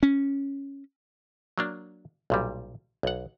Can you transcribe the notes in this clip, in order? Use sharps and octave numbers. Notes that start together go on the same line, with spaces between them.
C#4
F#3 A#3 D4
B1 A#2 G3
B1 F#5